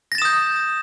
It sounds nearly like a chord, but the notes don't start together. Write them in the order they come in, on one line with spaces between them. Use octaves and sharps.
A#6 A6 E7 D#6 G6